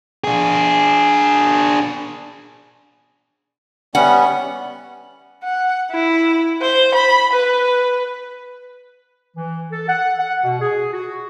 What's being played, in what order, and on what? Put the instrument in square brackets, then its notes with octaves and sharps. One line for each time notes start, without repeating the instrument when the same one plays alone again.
[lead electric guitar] D4 G#4
[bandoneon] G3 B3 C#4 [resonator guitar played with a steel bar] F#5
[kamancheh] F#5
E4
C5
B5
B4
[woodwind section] E3
A4
F#5
F#5
B2
G#4
F#4